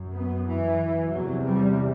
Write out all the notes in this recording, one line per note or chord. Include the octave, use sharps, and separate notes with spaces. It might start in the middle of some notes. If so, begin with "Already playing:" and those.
Already playing: F#2
B3
E3
E2 C3 F#3
G3